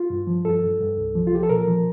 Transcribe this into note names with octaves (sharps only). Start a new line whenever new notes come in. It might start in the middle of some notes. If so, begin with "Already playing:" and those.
Already playing: F4
G2
F3
G2 A4
G2
G2
C2
F3
F4
F3 G4
A4
A#2 A#4
F3